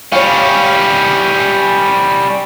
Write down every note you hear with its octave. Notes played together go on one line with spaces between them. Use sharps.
G3 C#4 C#5 F5